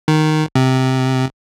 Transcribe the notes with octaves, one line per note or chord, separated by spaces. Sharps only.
D#3
C3